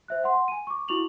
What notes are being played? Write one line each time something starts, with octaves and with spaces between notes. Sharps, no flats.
C5 E5 F#6
F#5 C6
G#5 D#7
C#6 D6
E4 F#4 C#6 D6 F7 F#7